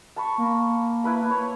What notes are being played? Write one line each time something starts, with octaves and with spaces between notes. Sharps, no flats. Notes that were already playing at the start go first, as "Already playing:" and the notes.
A5 B5 C#6
A#3
E4 B4 B5
C#5